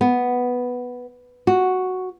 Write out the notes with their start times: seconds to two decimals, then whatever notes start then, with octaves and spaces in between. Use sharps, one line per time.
0.01 B3
1.47 F#4